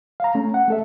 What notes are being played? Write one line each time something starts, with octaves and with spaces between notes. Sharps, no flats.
F5 A#5
A3 C#4
F#5
A3 A4 E5